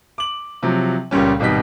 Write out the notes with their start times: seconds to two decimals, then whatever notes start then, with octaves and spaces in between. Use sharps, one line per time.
0.18 D6 F#7
0.63 C3 F3 F#3
1.11 C#2 A#2 G3 C#4
1.40 G#1 B2 G3 D#4 B6